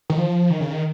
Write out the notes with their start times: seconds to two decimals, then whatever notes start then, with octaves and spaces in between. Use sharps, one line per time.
0.10 D#3
0.17 F3
0.50 D#3
0.60 C#3
0.72 D#3